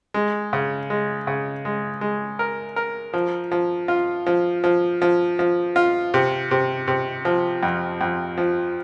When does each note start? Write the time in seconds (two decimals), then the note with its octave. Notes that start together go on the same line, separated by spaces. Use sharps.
0.14 G#3
0.53 C#3
0.90 G#3
1.27 C#3
1.65 G#3
2.01 G#3
2.39 A#4
2.76 A#4
3.13 F3
3.52 F3
3.88 F4
4.26 F3
4.64 F3
5.02 F3
5.39 F3
5.76 F4
6.14 C3
6.51 C3
6.88 C3
7.25 F3
7.63 F2
8.01 F2
8.38 F3